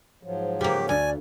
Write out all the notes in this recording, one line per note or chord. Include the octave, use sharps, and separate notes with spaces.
G#2 F3 F#3
C#3 A#3 G4
D2 D5 G#5